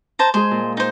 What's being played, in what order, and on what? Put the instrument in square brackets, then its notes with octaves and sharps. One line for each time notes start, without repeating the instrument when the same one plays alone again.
[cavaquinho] C5 A5 A#5
[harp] G#3 G#4 [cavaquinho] C5
[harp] A#2
[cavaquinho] D#4 C5